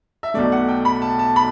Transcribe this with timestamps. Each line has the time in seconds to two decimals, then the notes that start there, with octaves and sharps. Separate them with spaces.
0.23 E5
0.34 B1 B2 A3 D5
0.52 F#5
0.69 G5
0.85 B5
1.02 A5
1.19 A5
1.36 B5